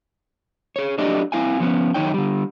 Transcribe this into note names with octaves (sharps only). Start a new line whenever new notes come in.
G#4 C#5
F#3 A3 D4 G4 D5 D#5
C4 E4 F5 G#5
F3 B3 C#4
F#2 D#3 G#3 D#4 C#5 G5
D3 G3